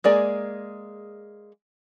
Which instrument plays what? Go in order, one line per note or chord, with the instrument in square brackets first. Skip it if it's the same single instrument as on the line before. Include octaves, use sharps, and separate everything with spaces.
[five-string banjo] G#3 A#3 G#4 D5